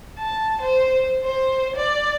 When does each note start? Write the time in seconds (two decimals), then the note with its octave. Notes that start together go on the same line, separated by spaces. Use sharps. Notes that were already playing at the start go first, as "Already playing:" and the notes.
0.19 A5
0.62 C5
1.23 C5
1.76 D5